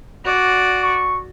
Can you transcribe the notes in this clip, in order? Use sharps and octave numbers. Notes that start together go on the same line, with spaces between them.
F#4 D5
C#6